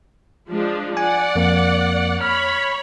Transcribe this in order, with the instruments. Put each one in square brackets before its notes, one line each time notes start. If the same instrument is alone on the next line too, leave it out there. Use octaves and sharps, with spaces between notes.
[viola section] F3 G#3 D4
[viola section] D5 F#5 [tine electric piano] G#5
[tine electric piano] F2 A#3
[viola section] C#5 B5 [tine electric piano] F6